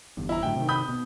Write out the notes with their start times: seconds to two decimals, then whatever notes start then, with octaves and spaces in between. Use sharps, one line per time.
0.17 G1 E2 G2
0.29 E4 A#5
0.43 A2 D3 F#3 G5
0.56 C3 D#3
0.68 B5 D#6 G6
0.89 B2